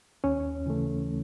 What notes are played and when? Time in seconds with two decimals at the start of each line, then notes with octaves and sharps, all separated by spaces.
0.24 D#2 C#4
0.66 C#3 E3 A3